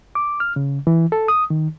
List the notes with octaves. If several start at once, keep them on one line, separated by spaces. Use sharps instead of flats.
D6
F6
C#3
E3
A4
D#6
D#3